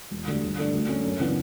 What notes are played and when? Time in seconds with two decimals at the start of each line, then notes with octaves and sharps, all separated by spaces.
0.11 E1
0.27 D2 D3 G3
0.42 G1
0.58 G2 D3 A3 D4
0.74 D2
0.88 D3 A3 C#4
1.05 F#2
1.20 C#3 E3 B3 D4